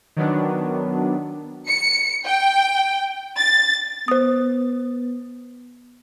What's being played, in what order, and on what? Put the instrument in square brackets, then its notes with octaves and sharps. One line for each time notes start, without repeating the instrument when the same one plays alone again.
[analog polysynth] D#3 F#3 B3 D4
[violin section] C#7
G5
A6
[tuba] B3 [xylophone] C5 D#6